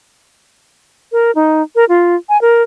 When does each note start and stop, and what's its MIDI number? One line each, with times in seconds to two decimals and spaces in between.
1.12 1.31 70
1.35 1.62 63
1.76 1.85 70
1.89 2.16 65
2.29 2.40 80
2.42 2.63 70